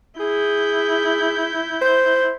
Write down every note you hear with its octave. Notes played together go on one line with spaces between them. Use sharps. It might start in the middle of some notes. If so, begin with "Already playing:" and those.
E4 G#4 G6
C5